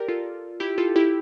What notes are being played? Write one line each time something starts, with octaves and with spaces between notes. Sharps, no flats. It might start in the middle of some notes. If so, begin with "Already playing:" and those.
Already playing: G4 A#4 D5
F4 A4
E4 G4
F4 A4
E4 G4